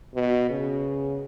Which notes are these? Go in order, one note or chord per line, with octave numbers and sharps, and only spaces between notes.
B2
C#3